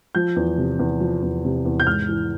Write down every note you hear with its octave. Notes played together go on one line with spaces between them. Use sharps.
F3 G6
E2
C3
E2
F3
E2
C3
E2
G6
G#2 F6
E3